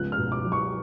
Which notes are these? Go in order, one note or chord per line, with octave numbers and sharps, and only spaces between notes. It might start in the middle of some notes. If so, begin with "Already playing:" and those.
Already playing: C#2 F3 B3 F#6
F6
B2
D6
F#3
C#6